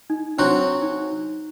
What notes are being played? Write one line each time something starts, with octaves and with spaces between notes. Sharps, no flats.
D#4
F#3 C4 D4 F#4
D#4